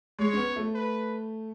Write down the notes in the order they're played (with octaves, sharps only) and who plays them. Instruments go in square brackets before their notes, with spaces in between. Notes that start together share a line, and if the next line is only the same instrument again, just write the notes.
[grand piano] G#3 [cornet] C#5
[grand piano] C#4
B3
A3
[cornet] B4